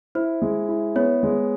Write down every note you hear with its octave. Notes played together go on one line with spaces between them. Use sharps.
E4 C5
G#3
E4
B3 C#5
G#3